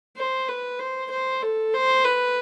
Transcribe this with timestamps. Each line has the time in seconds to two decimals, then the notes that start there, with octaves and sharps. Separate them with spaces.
0.17 C5
0.48 B4
0.79 C5
1.10 C5
1.42 A4
1.74 C5
2.04 B4